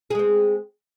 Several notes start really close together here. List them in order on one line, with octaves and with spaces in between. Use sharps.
G#4 G#3 C4